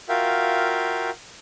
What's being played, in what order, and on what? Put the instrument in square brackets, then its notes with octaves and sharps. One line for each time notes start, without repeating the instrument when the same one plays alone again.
[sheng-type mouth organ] F4 F#4 A#4 E5 F5 G5